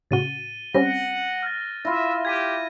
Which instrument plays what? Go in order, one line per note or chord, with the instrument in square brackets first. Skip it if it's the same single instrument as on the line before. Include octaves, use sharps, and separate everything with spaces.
[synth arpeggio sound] A2 C#3 F#4 [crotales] A6 D#7 G7
[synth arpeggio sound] G3 C4 C#4 [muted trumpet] F#5 [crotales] A#6
[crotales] F6 F#6 A6
[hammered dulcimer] E4 F4 [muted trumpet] E5 [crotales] A#6
[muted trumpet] G4 [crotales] G#6 B6 D#7